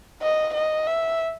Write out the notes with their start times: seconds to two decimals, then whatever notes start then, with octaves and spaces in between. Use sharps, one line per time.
0.22 D#5
0.54 D#5
0.87 E5